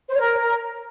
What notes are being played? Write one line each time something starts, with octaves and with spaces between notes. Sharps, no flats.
C5
C#5
A#4